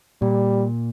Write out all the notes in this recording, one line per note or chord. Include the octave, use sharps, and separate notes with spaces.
A#2 G3